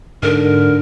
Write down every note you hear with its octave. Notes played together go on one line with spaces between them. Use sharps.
G#2 D3 A#4